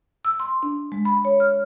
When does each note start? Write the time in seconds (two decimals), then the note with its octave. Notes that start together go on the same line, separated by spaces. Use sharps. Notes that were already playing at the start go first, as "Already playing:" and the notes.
0.25 E6
0.40 C6
0.63 D4
0.92 G#3
1.05 B5
1.25 C#5
1.40 F6